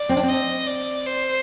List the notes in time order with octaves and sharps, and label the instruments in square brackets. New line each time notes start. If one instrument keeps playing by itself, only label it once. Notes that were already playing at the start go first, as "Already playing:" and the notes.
Already playing: [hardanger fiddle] D5
[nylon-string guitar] C4
D4
[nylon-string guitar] C4 [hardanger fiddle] D#5
[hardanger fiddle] D5
C5